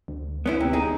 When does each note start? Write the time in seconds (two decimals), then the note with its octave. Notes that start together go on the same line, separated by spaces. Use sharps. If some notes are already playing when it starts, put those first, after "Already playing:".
0.08 D2
0.46 D2 B3 C#4 E4
0.60 C3
0.73 D#1 D#4 G#4